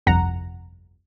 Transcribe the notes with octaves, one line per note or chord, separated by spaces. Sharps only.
G1 C2 F2 F#5 A#5